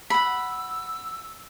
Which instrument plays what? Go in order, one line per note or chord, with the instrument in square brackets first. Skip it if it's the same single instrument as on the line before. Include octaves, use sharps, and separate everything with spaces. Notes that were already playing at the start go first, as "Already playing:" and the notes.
[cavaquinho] F#5 B5 [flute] E6